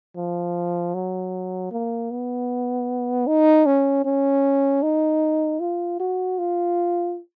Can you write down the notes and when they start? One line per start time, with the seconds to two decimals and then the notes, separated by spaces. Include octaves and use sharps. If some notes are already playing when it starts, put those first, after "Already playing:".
0.17 F3
0.94 F#3
1.72 A#3
2.11 B3
3.27 D#4
3.66 C#4
4.05 C#4
4.83 D#4
5.60 F4
6.00 F#4
6.39 F4